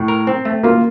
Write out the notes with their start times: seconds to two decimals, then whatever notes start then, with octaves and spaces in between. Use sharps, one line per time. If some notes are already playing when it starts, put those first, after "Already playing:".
Already playing: A2
0.08 A#4
0.27 C4
0.45 A3
0.63 A#3 F4